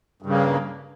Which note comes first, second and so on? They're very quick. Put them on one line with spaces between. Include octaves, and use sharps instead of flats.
G2 C#3 A#3